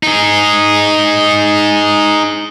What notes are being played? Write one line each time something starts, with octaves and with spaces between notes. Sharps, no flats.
D#4 G#4